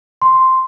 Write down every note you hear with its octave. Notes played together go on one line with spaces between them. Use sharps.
C6